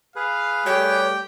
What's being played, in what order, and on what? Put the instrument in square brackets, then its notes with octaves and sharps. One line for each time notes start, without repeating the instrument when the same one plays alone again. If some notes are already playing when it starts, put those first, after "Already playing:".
[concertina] G#4 B4 [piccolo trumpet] F5
[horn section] G3 A3 G4 [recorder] C#5 [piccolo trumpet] G5